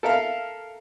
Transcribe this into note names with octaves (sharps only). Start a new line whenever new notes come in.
A4 A#4 E5 F5